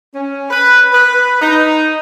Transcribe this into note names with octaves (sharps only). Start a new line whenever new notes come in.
C#4
B4
B4
D#4